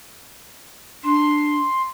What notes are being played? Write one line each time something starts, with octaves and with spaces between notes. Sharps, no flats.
D4 C6